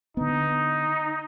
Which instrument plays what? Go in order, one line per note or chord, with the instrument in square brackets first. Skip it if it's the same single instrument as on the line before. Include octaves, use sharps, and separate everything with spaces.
[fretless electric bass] D3 B3 [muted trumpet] D#4